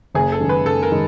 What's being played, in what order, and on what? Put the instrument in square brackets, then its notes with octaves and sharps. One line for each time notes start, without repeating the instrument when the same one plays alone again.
[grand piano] F#1 [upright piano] G#4
[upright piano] A4
[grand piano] F#2 D#3 G#3
[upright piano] B4
[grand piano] F#1 [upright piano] A4
[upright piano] A#4
[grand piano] D#3 G#3